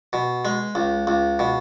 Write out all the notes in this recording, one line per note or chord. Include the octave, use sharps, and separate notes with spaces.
B2
G#3
C#2
C#2
B2